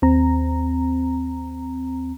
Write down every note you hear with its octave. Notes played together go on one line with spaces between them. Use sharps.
D#2 C4 A#5